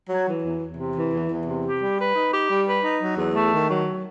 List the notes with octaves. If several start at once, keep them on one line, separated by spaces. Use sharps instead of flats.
F#3
E3
E2
E2
C3
E3
E2
E2
C3
G4
G3
B4
D#4
G4
G3
B4
D#4
F#3
E2
A3
D#3
F#3